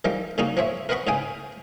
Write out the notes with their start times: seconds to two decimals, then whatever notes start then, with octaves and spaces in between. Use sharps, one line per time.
0.05 D#3 F3 G3 G4
0.38 C#3 G3 A#3 D#4 F#4
0.57 F3 C4 C#5 E5
0.89 A#4 B4 D#5 F#5 B5 C#6
1.07 G#2 C#3 G4 G#4 G5 G#5